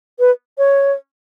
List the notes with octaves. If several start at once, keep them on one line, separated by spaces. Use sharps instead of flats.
B4
C#5